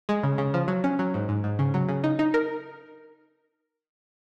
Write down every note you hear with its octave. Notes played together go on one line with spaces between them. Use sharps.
G#3
C#3
C#3
F3
F#3
C#4
F#3
G#2
G#2
G#2
C#3
F#3
C#3
D#4
D#4
A#4